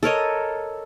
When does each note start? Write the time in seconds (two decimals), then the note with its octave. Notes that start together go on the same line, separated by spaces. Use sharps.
0.03 A4 A#4 C#5 D#5